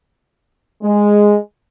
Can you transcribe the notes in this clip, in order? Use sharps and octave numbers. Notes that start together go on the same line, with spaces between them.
G#3